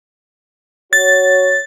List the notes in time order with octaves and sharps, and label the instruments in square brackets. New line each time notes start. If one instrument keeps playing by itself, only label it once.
[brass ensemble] F#4 C#5 [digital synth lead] A6